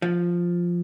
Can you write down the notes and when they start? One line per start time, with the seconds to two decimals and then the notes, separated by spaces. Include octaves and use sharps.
0.02 F3